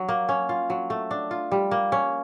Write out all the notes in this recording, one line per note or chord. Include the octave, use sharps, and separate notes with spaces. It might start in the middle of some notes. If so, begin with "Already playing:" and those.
Already playing: F#3
A#3
C#4
F4
F#3
A3
D4
F4
G3
A#3
C#4